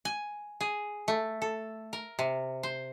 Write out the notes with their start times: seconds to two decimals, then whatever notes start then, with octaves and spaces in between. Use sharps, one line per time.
0.05 G#5
0.61 G#4
1.08 A3
1.42 A4
1.93 A#4
2.19 C3
2.63 C5